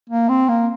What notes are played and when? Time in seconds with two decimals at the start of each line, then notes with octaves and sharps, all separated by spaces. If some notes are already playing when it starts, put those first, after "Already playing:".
0.10 A#3
0.29 C4
0.49 A#3